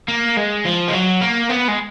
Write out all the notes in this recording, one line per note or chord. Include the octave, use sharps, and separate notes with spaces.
A#3
G#3
F3
G#3
F#3
A#3
B3
G#3